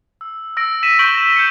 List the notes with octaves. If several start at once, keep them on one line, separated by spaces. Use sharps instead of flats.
E6
E6 A#6 D7
B6 D#7 E7
C#6 G6 B6 D7 F#7 G7
A#6 E7
G6 C#7